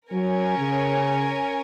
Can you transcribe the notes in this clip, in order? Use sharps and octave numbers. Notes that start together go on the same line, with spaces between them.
F#3 C#4 A#4 C#5 G#5
C#3